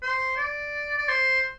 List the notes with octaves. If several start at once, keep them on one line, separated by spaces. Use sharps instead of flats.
C5
D5
D5
C5